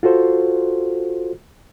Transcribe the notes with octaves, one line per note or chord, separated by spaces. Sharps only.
F4 F#4 A4 C5